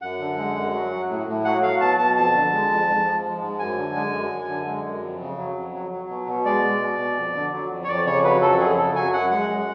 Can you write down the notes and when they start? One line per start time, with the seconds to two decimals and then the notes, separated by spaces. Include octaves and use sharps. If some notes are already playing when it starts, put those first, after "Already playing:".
0.02 F#2 F#5
0.20 D3
0.37 G#3
0.55 F#2
0.73 F#3
0.91 F#3
1.09 A2
1.27 A2
1.45 F#3 F#5
1.62 F#3 F5
1.80 B2 A5
1.98 B2 A5
2.16 F2 A5
2.34 D3
2.52 G#3
2.70 F2
2.87 G#2
3.06 F3
3.23 G#3
3.41 G#2
3.59 F#2 G#5
3.77 D3
3.95 G#3
4.13 F#2
4.31 F#2
4.49 D3
4.66 G#3
4.84 F#2
5.02 F2
5.20 C#3
5.38 F#3
5.56 F2
5.74 F#3
5.92 F#3
6.09 B2
6.27 B2
6.45 G#3 D5
6.64 G#3
6.81 B2
6.99 B2
7.16 F2
7.35 D3
7.53 F#3
7.70 F2
7.84 C#5
7.88 F2 D5
8.06 C#3 C#5
8.24 F#3 B4
8.42 F2 A4
8.60 F#2 G#4
8.77 C#3 A4
8.95 F#3 G#5
9.13 F#2 F#5
9.31 G#3 F#5
9.49 G#3